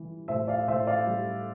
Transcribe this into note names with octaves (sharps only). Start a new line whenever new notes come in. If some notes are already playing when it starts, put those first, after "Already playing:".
Already playing: E3 G3
A2 C5 E5
D5 F5
A2 C5 E5
D5 F5
G3